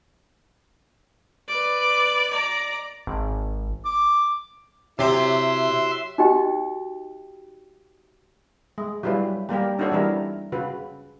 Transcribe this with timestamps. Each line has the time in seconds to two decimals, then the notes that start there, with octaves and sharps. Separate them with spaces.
1.48 B4 D5
2.31 D5 A#5
3.07 G#1
3.85 D6
4.99 C3 F#3 E4 G4 E5 C6
6.18 D#4 F#4 G4 D#5 G5
8.78 G#3
9.03 F#3 G3 E4 F4 B4
9.49 G3 A#3 G4 A#4
9.79 C4 D4 D#4 F#4 A4 C#5
9.92 E3 G3 E4 A#4
10.52 C#3 F4 F#4 B4